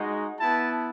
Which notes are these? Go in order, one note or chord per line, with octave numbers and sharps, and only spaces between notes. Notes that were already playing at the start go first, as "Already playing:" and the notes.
Already playing: G#3 D#4 F#4
B3 E4 A5